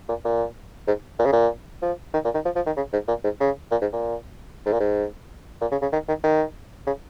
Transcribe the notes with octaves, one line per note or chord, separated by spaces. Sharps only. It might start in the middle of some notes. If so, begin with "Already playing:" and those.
A#2
A#2
G#2
A#2
C#3
A#2
F3
D#3
A#2
D#3
F3
F3
D#3
C#3
G#2
A#2
G#2
C#3
A#2
G#2
A#2
G#2
A#2
G#2
A#2
C#3
C#3
D#3
D#3
D#3
C#3